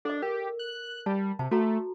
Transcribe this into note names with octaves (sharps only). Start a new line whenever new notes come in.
D4 A4 D#5
G4 A#4
F#6
G3 A5
C3 A5
A3 F#4 A4 A#5